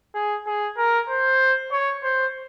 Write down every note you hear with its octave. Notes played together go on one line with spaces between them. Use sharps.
G#4
G#4
A#4
C5
C#5
C5